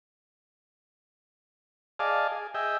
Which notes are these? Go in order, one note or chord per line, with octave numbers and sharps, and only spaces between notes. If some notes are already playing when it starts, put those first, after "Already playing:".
G#4 D5 D#5 F5 A5
G#4
G#4 D#5 E5 G5